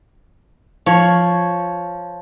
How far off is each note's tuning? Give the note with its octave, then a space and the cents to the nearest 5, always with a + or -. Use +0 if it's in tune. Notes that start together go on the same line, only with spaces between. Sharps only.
F3 +0 C#5 -5